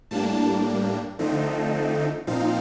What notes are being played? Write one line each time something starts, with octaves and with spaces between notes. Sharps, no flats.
A2 G3 A#3 D4 A5
D3 F3 A3 C4 D#4
A#2 F3 C4 D#4 F5